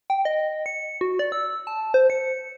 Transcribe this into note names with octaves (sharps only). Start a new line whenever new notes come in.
G5
D#5
C#7
F#4
D5
E6
A5
C5
C#7